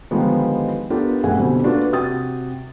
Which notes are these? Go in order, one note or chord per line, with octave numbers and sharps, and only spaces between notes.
D3 D#3 F3 G3 G#3 B3
B3 D4 F4 G4 A4 A#4
D#1 F#2 A2 G#4 F#5 G#5
B2 D3 G3 C4
A#3 D4 F4 F#4 A4 B4
C3 F#4 G5 D#6 A6